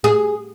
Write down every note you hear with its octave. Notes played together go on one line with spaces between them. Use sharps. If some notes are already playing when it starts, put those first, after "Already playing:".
G#4